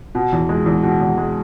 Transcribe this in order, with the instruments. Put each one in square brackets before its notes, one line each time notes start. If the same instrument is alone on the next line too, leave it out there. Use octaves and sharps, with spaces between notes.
[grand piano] B2
E2
G#3
E2
B2
E2
G#3